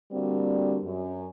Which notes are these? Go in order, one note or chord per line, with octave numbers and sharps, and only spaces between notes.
D3 G3 A#3 C4 D4 F#4
F#2